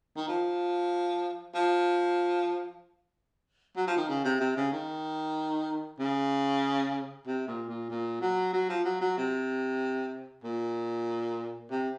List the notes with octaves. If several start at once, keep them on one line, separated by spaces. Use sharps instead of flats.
D#3
F3
F3
F#3
F3
D#3
C#3
C3
C3
C#3
D#3
C#3
C3
A#2
A#2
A#2
F#3
F#3
F3
F#3
F#3
C3
A#2
C3